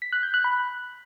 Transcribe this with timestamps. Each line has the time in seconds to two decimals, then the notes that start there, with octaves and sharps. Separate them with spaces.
0.02 B6
0.12 F#6
0.23 G6
0.34 F#6
0.44 B5